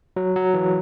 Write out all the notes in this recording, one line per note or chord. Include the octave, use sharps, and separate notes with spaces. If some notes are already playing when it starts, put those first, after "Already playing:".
F#3
F#3
E3